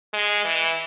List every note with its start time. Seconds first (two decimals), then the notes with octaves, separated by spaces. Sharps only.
0.13 G#3
0.45 E3